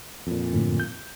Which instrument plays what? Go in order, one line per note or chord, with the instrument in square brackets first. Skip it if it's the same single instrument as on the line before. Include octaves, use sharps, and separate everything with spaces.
[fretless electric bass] F2 A#2
[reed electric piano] F#2 A2 D3
G6